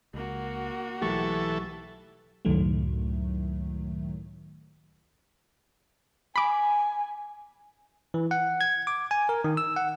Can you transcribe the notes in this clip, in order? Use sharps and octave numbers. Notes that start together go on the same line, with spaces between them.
C#2 A#3 F#4
B1 E3 F#3 A3 G4 A4 C#6
C#2 F#2 A2 D#3 F#3 A3
G#5 B5 D6
E3
F#5
G#6
D6
G#5
A#4
D#3
E6
F#5